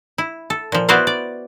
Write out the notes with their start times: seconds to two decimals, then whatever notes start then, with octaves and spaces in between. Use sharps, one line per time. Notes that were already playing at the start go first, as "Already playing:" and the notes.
0.18 E4
0.50 A4
0.72 A#2 F3
0.89 B3 E4 F#4 C5 D5 F5
1.07 D5